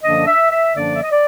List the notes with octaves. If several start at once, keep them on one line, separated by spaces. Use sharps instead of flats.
F#2 D3 F3 A#3 D4 D#5
E5
E5
F#2 D3 F3 A#3 D4 D5
E5
D#5
D5